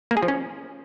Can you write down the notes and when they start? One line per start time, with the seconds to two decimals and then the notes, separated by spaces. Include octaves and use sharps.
0.11 A#3
0.17 G#4
0.23 F3
0.28 C#4